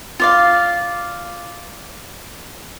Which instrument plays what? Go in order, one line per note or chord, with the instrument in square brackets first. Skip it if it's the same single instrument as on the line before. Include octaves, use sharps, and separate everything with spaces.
[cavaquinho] F4 D5 F5